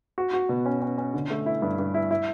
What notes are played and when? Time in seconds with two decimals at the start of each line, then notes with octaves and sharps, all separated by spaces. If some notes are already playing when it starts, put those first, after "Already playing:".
0.18 F#4
0.33 F#4
0.49 B2
0.66 C#4
0.82 C#4
0.98 C#4
1.14 D3
1.30 A3
1.46 E4
1.62 G2
1.79 G2
1.94 E4
2.11 E4